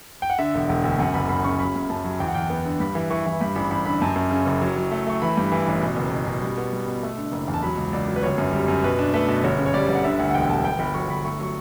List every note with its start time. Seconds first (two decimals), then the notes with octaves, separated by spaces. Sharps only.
0.22 G5
0.30 F#5
0.39 D3 E5
0.55 E1
0.69 E1
0.84 D2
0.99 F#2 F#5
1.14 F#1 B5
1.29 F#2 B5
1.44 C#3 C#6
1.59 F#3 B5
1.75 F#2
1.90 F#2 A5
2.04 F#3
2.20 E2 G5
2.28 F#5
2.34 E2 G5
2.50 B3
2.65 D3
2.80 G2 B5
2.95 E3
3.10 E3 C#6
3.26 E3
3.40 G2 B5
3.56 A1 B5
3.71 A1 B5
3.85 D3 B5
4.01 F#2 A5
4.16 F#2
4.31 C#3
4.46 F#1
4.62 F#3
4.76 F#3
4.91 A3
5.07 A3 C#6
5.22 E3 B5
5.37 G2
5.52 E3
5.67 A1
5.82 B2
5.97 F#1
6.11 B2
6.27 B2
6.42 G3
6.58 B3
6.73 G3
6.87 B2
7.03 A3
7.18 D3
7.32 F#1
7.48 E2
7.54 A5
7.63 F#3 B5
7.77 C#2
7.93 C#2 D5
8.08 F#3
8.16 B4
8.23 G1 C#5
8.38 F#2
8.53 G3
8.68 F#2
8.84 B2 B4
8.99 D4
9.14 A3 B4
9.28 B2
9.44 G1 C#5
9.58 C#3
9.66 C#5
9.74 G3 D5
9.89 G1
9.95 F#5
10.04 D3 E5
10.19 D2 F#5
10.30 F#5
10.34 E1 G5
10.49 E1 A5
10.65 G1 G5
10.79 G1 B5
10.94 F#3 C#6
11.10 G1 B5
11.25 A3 C#6
11.40 F#3 C#6